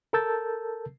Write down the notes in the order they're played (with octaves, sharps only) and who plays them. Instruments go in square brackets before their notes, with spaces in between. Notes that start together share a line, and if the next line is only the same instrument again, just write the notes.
[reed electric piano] A4 A#4 A5 E6 G6 A6